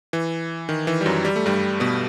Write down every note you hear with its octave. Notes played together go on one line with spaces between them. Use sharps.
E3
D#3
E3
G3
F#2 F#3
G3
A3
G2 G3
B2 B3